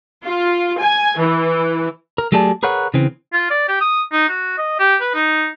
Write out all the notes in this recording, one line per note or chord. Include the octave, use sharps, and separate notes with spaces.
F4
G#5
E3
A#4
F#3 A3 G4 G#4 D5 A5
G#4 A#4 B4 C#5 F#5
C#3 E3 C4
F4
D5
G4
D#6
D#4
F#4
D#5
G4
B4
D#4